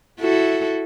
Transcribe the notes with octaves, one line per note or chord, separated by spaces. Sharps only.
E4 F#4 A4